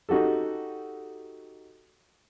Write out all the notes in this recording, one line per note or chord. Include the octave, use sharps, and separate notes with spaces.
D#4 F#4 G4 A4